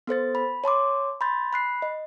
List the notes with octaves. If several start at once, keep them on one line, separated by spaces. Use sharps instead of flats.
B3 A4 C5 A6
B5
C#5 A5 C6 D6
B5 C6 G6 A6
B5 F#6 C7
D#5